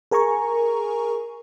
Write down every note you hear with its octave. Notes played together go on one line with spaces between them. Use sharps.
G#4 A#4 G#5 A#5 C#6